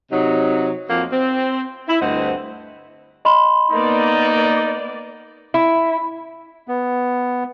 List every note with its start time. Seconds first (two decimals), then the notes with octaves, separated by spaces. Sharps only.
0.12 C3 F#3 D#4
0.89 F2 A#3 F#4
1.11 C4
1.88 E4
2.01 D2 G2 C4 C5 D#5 F#5
3.25 D#5 B5 C6
3.72 A#3 B3 D#4 D5
5.54 E4
6.68 B3